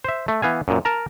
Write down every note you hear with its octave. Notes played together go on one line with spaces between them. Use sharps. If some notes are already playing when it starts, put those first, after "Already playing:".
C5 E5
A3
E3 B3 F5 G#5
F#2 A#2
A#4 A5 A#5